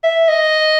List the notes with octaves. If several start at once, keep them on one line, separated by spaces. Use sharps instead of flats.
E5
D#5